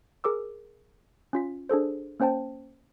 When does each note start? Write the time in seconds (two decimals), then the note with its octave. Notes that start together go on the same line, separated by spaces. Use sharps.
0.24 G#4 A#4 D6 E6
1.33 C#4 F4 B6
1.69 D4 G#4 A4 C5
2.20 A#3 C#4 C5 G5 A5